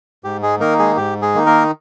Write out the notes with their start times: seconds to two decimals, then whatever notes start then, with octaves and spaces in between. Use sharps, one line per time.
0.24 G#2 G4
0.42 G#3 G#4
0.60 D#3 A#3 D#4 A#4
0.79 G#3 G#4
0.97 G#2 G4
1.22 G#3 G#4
1.35 D#3 A#3
1.38 D#4
1.46 A#3 A#4